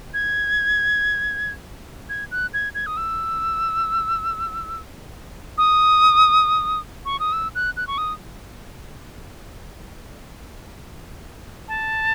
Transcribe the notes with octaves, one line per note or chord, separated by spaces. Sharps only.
G#6
G#6
F#6
G#6
G#6
D#6
E6
D#6
C#6
D#6
E6
F#6
F#6
C#6
D#6
A5